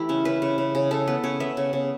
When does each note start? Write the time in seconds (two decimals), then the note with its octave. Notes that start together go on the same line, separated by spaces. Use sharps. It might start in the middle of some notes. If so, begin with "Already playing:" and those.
Already playing: E3 A3 E4 G4
0.09 C#3 C#4
0.25 C#3 B4
0.42 C#3
0.58 C#3
0.75 C#3
0.91 C#3 A4
1.07 B3 B4
1.24 C#3 C#5
1.40 B3 E5
1.57 C#3
1.73 C#3